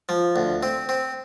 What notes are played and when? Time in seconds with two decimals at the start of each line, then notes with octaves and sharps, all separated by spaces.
0.09 F3
0.36 D2
0.63 C4
0.89 C4